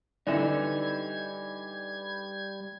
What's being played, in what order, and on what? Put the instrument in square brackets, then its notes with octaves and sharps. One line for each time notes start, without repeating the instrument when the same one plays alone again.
[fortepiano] D3 E3 [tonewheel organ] G3 G#6 [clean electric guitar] D#4 E5 [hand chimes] D5